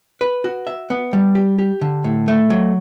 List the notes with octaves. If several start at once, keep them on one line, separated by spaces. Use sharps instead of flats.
B4
F#4
E5
B3
G3
G4
G4
D3
A2
A3
F#3